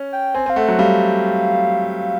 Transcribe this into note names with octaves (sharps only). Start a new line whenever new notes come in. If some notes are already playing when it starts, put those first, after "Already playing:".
Already playing: C#4
G5
C4 G#5
C4
F5
A3 F#5
F#3 F#5
G3 F5